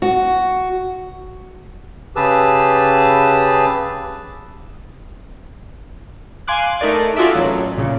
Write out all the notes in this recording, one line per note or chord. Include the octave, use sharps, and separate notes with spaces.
F#4
C#3 G4 G#4 B4 A5 E6
F5 G#5 C6 D6 F#6
A3 D#4 A#4 D5
F4 F#4 G#4 A4 D5 E5
A1 F#3
A#2 C#3